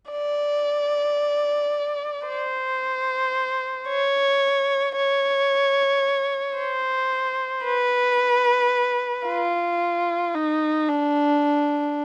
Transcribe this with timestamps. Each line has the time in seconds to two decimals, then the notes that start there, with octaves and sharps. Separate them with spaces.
0.11 D5
2.27 C5
3.88 C#5
4.97 C#5
6.58 C5
7.65 B4
9.26 F4
10.35 D#4
10.89 D4